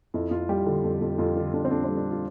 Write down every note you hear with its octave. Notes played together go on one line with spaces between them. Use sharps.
F2 E4
F2 F4
G3 G4
D3
F2
F2
F2 F4
D3 F4
F2 D4
C4
F2 D4
G3 C4
D4
F4